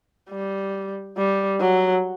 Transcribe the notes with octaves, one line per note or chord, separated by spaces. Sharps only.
G3
G3
F#3